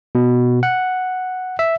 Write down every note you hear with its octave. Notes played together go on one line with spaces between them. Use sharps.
B2
F#5
E5